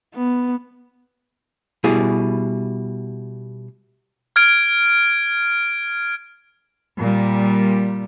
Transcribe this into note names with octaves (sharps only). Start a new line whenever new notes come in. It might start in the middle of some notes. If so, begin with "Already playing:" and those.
B3
B2 G3 E4 G#4
F6 G#6 D7
A#2 G3